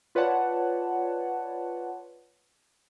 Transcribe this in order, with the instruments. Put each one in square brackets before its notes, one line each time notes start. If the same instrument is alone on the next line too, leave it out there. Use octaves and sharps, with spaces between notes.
[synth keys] F4 B4 C#5 D5 F#5 A5